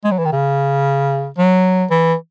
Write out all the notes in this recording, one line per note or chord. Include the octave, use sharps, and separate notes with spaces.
G#3
F#3
E3
D#3
C#3
F#3
E3